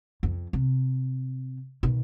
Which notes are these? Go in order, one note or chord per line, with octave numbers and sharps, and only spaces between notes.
F2
C3
B2 D#3